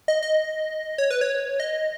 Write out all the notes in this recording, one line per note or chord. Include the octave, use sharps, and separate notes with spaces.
D#5
D#5
C#5
B4
C#5
D#5